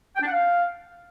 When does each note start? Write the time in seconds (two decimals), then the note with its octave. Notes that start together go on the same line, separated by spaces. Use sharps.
0.16 G5
0.21 D4
0.27 F#5
0.33 F5